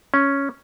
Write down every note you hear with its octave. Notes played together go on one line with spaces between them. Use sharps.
C#4